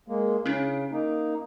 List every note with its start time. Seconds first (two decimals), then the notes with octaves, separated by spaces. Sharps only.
0.08 G#3 A#3
0.46 C#3 C#4 D4 E4
0.92 A#3 D#4